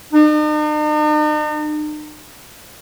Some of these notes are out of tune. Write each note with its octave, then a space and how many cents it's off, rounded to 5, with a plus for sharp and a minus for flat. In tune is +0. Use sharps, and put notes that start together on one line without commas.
D#4 -45